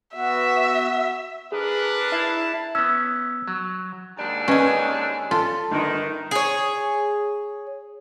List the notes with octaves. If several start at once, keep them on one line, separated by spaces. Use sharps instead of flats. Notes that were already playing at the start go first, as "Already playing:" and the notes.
B3 F#4 E5
D4 G#4 A#4 B4
E4 E5 A5 C7
B3 C#4 E6
F#3
D#2 G#2 D4
C#4 B4 D#5 G#5
F4 A4
G1 D#3
G#4 C#5